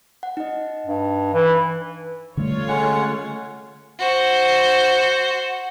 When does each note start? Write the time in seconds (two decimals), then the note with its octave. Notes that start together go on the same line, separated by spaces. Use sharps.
0.23 F#5
0.37 D#4 D#5
0.86 G2
1.34 E3
2.37 D3 G3 A3 F4 A4 C#5
2.69 G#3 C#4 F#5
3.99 F#4 C5